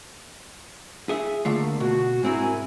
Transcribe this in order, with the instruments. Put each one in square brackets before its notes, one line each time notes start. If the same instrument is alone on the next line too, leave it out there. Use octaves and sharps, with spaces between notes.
[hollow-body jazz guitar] G#4 E5
[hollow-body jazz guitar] D3 A3 F4 [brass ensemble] A#3
[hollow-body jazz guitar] B2 [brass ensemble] F#4
[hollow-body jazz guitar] G#2 C4 E4 [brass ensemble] F#4 A#4 G#5